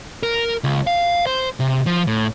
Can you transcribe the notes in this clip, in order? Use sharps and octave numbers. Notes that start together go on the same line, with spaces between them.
A#4
C#2
F5
C5
C3
F3
A2